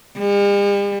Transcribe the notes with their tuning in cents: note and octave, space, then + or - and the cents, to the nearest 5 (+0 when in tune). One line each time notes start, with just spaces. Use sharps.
G3 +45